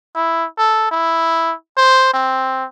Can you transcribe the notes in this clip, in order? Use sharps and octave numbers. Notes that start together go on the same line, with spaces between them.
E4
A4
E4
C5
C4